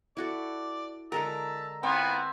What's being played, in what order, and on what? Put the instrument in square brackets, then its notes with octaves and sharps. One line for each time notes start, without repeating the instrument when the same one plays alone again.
[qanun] E4 F#4 A4 [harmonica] D5
[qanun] D3 G#3 A#4 [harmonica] E5 A5 [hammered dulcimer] A#5
[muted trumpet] B3 [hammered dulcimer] C4 [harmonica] E4 F4 G#5